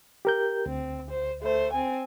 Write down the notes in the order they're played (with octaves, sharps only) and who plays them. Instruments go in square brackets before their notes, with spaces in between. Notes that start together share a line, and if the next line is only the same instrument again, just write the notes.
[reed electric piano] G4 A#4 G6
[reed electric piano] D2 [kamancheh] C4
[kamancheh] C5
A3 C5
C4 G#5